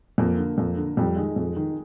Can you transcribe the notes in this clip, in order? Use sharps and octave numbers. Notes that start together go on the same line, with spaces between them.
F2 A#3
D3
F2
D3
F2 G3
D#3 G#3
F2
D#3